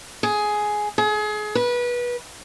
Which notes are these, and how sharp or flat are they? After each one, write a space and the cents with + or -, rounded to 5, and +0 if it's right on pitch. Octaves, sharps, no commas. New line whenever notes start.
G#4 +10
G#4 +30
B4 -25